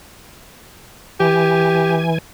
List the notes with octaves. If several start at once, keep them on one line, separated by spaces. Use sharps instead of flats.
E3 G4 G#5